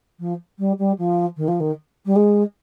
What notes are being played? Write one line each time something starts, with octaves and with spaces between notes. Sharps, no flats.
F3
G3
G3
F3
D#3
F3
D#3
G3
G#3